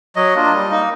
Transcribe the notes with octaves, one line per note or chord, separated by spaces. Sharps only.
F#3 D#5
A#3 D4 F4
G3
A#3 D#4